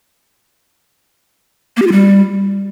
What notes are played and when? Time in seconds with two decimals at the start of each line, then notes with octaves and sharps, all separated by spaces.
1.77 A#3
1.82 G4
1.87 F4
1.92 G3